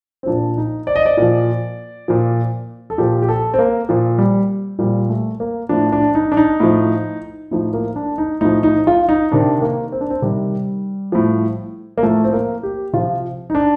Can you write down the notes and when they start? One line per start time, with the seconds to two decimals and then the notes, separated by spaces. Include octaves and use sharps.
0.23 C4
0.26 A#2 F3 D4
0.58 D#4
0.87 D5
0.96 D#5
1.06 D5
1.17 A#2 F3
2.08 A#2 F3
2.90 A4
2.98 A#2 F3 G4
3.22 G4
3.29 A4
3.54 C4
3.59 A#3
3.89 A#2 F3
4.18 G3
4.79 A#2 F3 G3
5.09 A3
5.40 A#3
5.69 A2 F3 D4
5.92 D4
6.15 D#4
6.32 D4
6.37 D#4
6.60 A2 F3
7.51 A2 F3 D#4
7.73 A#3
7.96 D4
8.18 D#4
8.41 A2 F3 D#4
8.63 D#4
8.87 F4
9.09 D#4
9.32 C3 D#3 D4
9.62 A#3
9.92 C4
10.01 D4
10.10 C4
10.22 C3 D#3 G3
11.12 A2 F3
11.97 A#3
12.03 A2 F3 A3
12.24 C4
12.33 A#3
12.63 G4
12.93 C3 F3 F4
13.50 D#4
13.55 D4